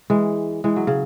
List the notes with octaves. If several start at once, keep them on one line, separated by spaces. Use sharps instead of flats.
E3 G#3
E3 G#3
F#3
C#3